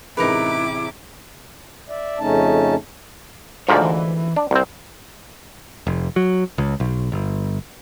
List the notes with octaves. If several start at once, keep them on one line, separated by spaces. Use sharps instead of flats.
A1 C3 G#3 D#4 E4 A#4 B4 D6
D5 E5
F2 C#3 A3 C#4 D#4 A5
D2 G#2 F3 C#5 D5
E3
D4
C2 C4
F1
F#3
C#2
B1
G1